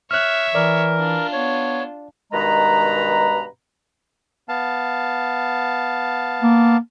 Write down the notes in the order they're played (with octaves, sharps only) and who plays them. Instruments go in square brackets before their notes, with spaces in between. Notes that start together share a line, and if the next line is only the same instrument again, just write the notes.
[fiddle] C#5 E5 [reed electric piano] F6 F#6
[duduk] E3 [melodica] A#4 [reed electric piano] D5
[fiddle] D4 F4
[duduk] B3 [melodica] C#5
[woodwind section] G2 B2 D#3 G#3 B4 A#5
[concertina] B3 F5 A5
[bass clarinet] A#3